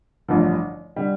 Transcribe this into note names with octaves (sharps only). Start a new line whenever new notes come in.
A1 G2 D3 F3
D3 G3